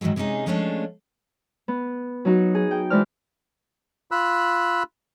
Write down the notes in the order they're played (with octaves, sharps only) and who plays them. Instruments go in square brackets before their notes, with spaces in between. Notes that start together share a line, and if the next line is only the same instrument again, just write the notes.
[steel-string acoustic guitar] G#2 D#3 E3 F#3 G#3
C3 G#3 C#4 D#4 G#4
F3 G#3 A3 C#4 D4 F4
[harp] B3
F#3 D#4 F#4
G#4
G5
E3 G#3 C5 D5 F6
[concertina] F4 B5 E6 F#6